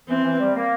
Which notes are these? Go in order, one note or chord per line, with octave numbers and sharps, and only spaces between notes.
E3 C4
E3
G3
A#3